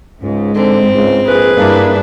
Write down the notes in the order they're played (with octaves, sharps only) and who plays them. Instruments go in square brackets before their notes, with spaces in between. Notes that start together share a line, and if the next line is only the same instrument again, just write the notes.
[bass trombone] C#2 [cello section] G#2
[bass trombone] D3 [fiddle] C4
[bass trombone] C#2
[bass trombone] A#1 [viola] G#4 B4
[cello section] G2 D4 E4 [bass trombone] A#3